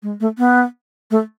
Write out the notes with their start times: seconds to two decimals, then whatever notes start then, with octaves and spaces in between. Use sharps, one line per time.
0.03 G#3
0.20 A3
0.38 B3
1.11 A3